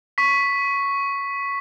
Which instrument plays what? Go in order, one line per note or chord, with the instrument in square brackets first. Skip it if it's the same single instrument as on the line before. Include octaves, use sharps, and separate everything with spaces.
[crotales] C#6 B6